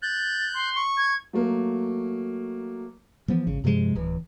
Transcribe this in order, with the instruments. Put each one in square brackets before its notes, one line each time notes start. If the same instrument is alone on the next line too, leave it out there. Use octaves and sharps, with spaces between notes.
[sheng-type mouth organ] F#6 G6 [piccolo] A6
[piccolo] C6
[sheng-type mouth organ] C#6
[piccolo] G#6
[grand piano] F#3 A3 A#3
[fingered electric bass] E3 F3 B3
G#1 C#3
G2 C3 F3 G#3
D1 E3